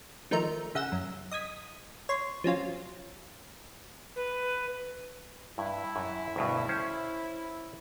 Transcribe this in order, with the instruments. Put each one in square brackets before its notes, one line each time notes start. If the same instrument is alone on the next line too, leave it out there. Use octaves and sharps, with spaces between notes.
[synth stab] D#3 F3 A3 D#4 A#4
C#3 E5 F#5 G6 A#6 E7
F#2
D#5 D#6 G#6 B6
C#5 C6
F3 F#3 C#4 F4
[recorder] B4
[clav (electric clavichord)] G2 [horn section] E4
[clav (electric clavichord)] F#2
D2 G2 B2
C#4 C5